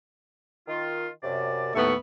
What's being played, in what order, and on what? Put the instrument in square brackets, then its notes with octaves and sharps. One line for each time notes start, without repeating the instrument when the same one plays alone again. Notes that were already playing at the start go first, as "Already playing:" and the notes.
[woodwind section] D#3 F4
F#2 C3 D5
[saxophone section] D#2 A2 B3 [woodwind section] E5 C#6